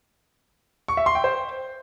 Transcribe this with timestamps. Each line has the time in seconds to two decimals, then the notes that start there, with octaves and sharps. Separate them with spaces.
0.88 C#6
0.97 E5
1.06 C6
1.15 G5
1.24 C5